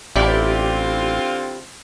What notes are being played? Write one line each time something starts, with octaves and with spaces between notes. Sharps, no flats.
A1 D3 C4 E4 F4 G4 D5